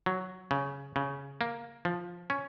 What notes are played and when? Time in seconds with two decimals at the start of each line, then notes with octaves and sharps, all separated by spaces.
0.06 F#3
0.51 C#3
0.96 C#3
1.41 A#3
1.85 F3
2.30 C#4